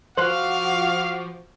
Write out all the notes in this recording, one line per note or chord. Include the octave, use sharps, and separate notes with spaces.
F3 F#4 C5 F5 D6 F#6